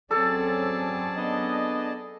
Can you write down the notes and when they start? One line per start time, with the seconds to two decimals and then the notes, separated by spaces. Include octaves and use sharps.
0.11 F#3 C4 C#4 G#4 A4 D5 A5
1.17 B3 D4 D#5